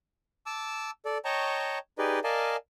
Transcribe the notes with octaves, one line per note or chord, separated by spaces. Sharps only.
A5 D6 E6
A4 D5
C#5 D#5 G5 A5 A#5 C#6
D#4 G4 G#4 B4 D5 D#5
A#4 D5 D#5 F5 G#5 A5